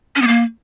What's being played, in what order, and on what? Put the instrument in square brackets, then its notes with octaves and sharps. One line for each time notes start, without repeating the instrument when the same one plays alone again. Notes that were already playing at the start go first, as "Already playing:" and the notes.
[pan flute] C#4
B3
A#3